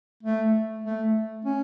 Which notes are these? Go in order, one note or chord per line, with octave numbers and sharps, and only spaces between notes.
A3
A3
C#4